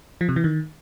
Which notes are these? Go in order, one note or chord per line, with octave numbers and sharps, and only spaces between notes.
F3
C3
E3
D#3